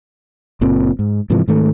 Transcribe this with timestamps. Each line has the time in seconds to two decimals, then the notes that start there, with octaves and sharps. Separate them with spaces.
0.61 F#1 A#2 C4
0.99 G#2
1.30 G#2 C3 E3 F3
1.48 G#2 D#3 A3